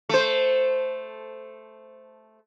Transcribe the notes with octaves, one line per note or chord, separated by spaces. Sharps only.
A3 C5